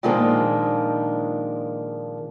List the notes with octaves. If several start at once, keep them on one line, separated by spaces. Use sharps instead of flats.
A#2 D#3 F3 G#3 A#3 D4